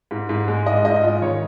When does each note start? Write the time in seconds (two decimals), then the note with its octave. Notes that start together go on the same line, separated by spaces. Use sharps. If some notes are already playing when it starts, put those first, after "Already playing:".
0.11 G#2
0.29 G#2
0.48 G#3
0.66 G#2 D#5
0.85 G#2 D#5
1.03 G#3 F4
1.22 D#3 C#5